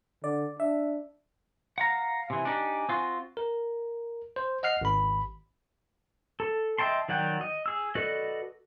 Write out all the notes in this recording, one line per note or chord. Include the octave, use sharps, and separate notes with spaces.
D3 D5
D4 E5
F5 F#5 A#5
C3 E3 G#5
D4 D#4 G4
C4 F4 F#4
A#4
C5
D#5 F#5 F6 C7
G#1 B5
A4
D#5 E5 G5 A5 C6
D#3 F#3 D5 F#5 G5
D#5
G#4 E6
F#4 A4 B4 D5 D#5